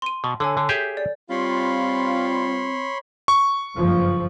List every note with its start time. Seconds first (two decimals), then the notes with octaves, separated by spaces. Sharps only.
0.02 C6 D#7
0.24 B2
0.40 D3 A4 C#5 G#5
0.57 D3
0.69 G4 G#4 E5 G6
0.97 D5
1.30 G3 C4 F4 C#5 B5 C6
3.28 C#6
3.75 F#1 G2 F3